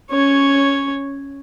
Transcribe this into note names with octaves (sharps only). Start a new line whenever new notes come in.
C#4 C#5